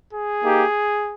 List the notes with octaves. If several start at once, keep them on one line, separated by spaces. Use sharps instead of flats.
G#4
A#3 D#4 G4